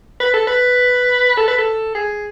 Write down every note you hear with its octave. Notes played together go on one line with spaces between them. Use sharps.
B4
A4
B4
A4
B4
A4
G#4